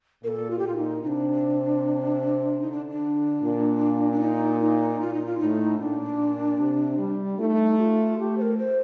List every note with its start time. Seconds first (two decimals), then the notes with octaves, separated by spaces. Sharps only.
0.23 A#2 A#4
0.28 A4
0.50 F4
0.59 G4
0.63 A#2 F4
0.77 D#4
1.02 C3 D4 D#4
2.61 D3 D#4
2.72 D4
2.90 D4
3.41 A#2
4.12 D4
4.20 D#4
4.60 D#4
5.00 A#2 F4
5.14 D#4
5.26 F4
5.39 A2 D#4
5.80 A#2 D4
6.59 C3
6.98 G3
7.38 A3 F4
7.43 D#4
7.78 G4
7.81 F4
8.18 A3 G4
8.38 C5
8.42 A#4
8.58 C5